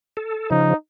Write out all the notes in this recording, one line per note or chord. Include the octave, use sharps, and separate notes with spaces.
A4
C#3 F3 D#4